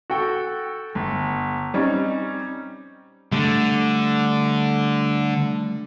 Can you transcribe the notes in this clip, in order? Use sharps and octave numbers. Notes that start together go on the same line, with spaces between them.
F#4 A4 G5
G1
G3 C4 C#4 D#4
D3 G3 A3